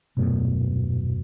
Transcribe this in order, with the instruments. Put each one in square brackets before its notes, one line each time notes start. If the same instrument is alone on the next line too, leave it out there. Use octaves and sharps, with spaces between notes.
[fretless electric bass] D#1 F#2 B2 A3